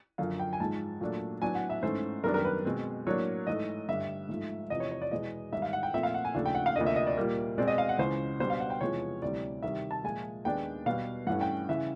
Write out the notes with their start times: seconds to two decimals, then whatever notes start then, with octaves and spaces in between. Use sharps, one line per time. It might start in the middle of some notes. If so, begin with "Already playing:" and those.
0.18 F#2 D3 F3 F5
0.40 G5
0.53 G#5
0.60 G#2 F3 G#3 A5
1.01 A#2 F#3 A3 D4
1.41 A2 F#3 B3 D4 G#5
1.55 F#5
1.70 E5
1.83 G#2 E3 A3 C#4 C5
2.24 F#2 D#3 G3 B3 D4 A#4
2.34 A#4
2.45 B4
2.65 B2 G#3 C4
3.07 A2 F#3 A#3 D4 C#5
3.47 G#2 E3 A3 D#5
3.89 G2 D3 G3 E5
4.29 G#2 F3 A3
4.70 E2 C3 F3 D#5
4.80 C#5
4.92 C#5
5.02 D5
5.11 E2 B2 G#3 B3 D#5
5.52 G#2 D#3 G3 E5
5.62 F5
5.73 F#5
5.83 G5
5.93 A#2 F3 A3 C4 E5
6.03 F5
6.14 F#5
6.25 G#5
6.34 D#2 C#3 F3 A3 D4
6.46 G5
6.55 F#5
6.66 F5
6.76 D2 C3 F3 A#3 D4 D#5
6.86 E5
6.96 D#5
7.07 D5
7.17 A#2 G3 A#3
7.58 B2 G#3 C4 D5
7.68 D#5
7.78 F5
7.89 F#5
7.98 C#2 C#3 E3 C5
8.39 B2 G3 B3 D4 C5
8.50 F5
8.60 F#5
8.70 G5
8.81 E2 C3 F3 G#3 B3 C#5
9.22 D2 C3 E3 G3 D5
9.63 C3 D#3 G3 E5
9.91 A5
10.04 A#2 F3 G#3 G#5
10.45 D#2 D#3 G#3 B3 D4 G5
10.86 B2 G3 B3 F5
11.27 G2 E3 A3 C#4 F#5
11.41 G5
11.69 C#3 E3 E5